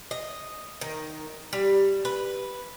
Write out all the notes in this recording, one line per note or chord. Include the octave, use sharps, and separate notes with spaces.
D#5
D#3
G3
B4